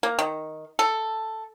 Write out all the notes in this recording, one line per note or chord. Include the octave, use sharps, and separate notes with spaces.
A#3
D#3
A4